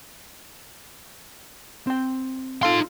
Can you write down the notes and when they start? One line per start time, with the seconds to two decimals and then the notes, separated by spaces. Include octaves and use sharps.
1.87 C4 G5
2.63 D#4 F4 A4 C6